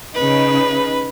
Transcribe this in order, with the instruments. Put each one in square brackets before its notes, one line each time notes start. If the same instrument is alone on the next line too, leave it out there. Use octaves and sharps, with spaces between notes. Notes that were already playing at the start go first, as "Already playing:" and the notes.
[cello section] C#3 D#4 [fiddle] B4